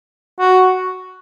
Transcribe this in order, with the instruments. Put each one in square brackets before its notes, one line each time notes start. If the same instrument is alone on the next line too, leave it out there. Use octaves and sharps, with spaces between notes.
[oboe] F#4